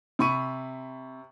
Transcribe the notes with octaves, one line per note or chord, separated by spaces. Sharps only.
C3 B5 C#6 D#7